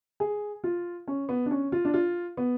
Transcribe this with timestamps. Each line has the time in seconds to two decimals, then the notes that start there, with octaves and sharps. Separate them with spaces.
0.20 G#4
0.64 F4
1.08 C#4
1.29 B3
1.46 D4
1.51 C#4
1.72 F4
1.85 D4
1.94 F4
2.37 B3